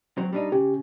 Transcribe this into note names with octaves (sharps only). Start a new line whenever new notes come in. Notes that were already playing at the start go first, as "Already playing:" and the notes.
F#3 C4
G3 D4 D#4
C#3 G4